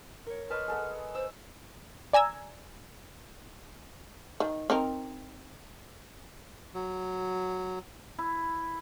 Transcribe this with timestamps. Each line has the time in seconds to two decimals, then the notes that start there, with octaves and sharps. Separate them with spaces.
0.26 A#4 C#5
0.50 B4 D#5 A5 C6 C#6 F6
0.68 G#4 A4 F#5
1.15 C5 E6
2.13 D5 G#5 A#5 E6 G#6
4.40 D#3
4.70 C4 D#4 A#4
6.74 F#3
8.19 E4